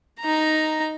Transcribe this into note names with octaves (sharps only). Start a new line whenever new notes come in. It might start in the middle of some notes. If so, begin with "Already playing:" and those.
D#4 A#5